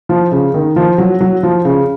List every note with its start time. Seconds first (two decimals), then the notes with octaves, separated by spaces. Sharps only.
0.09 F3
0.32 C#3
0.54 D#3
0.76 F3
0.98 F#3
1.21 F#3
1.43 F3
1.65 C#3